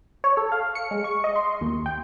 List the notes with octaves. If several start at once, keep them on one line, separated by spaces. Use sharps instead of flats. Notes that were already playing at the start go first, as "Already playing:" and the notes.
C#5
A4
F5
C#7
G#3
C#6
D#5
C6
D#2
G5